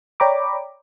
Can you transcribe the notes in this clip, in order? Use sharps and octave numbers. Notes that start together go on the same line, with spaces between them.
C#5 D5 G5 A#5 B5 D6